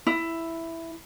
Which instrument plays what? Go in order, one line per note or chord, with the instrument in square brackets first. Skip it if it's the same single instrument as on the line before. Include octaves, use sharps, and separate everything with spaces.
[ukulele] E4